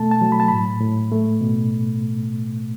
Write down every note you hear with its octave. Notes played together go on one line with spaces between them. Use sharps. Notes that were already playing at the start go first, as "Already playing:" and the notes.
Already playing: B2 A3 A5
A5
F#3
B5
A5
A2 B5
A2
A3
B2